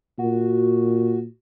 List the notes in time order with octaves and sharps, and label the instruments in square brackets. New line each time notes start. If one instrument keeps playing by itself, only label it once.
[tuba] A#2 [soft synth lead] F#4